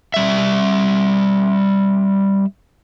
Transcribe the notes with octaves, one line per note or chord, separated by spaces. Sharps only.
G3 E5